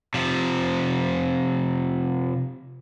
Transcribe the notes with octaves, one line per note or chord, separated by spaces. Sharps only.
C3 F3